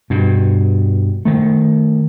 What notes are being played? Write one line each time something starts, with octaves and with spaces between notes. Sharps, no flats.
G2 B2
D#3 A3